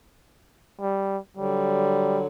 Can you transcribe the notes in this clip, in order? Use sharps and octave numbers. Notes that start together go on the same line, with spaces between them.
G3
D3 F#3 G3